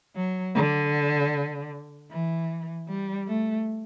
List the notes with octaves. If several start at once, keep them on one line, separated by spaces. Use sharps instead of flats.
F#3
D3
E3
G3
A3